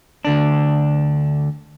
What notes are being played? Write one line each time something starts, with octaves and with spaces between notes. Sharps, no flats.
D2 D3 D4